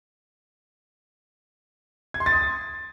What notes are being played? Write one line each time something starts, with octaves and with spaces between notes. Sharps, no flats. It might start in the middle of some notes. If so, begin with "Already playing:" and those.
G#6
C6
A6
D#6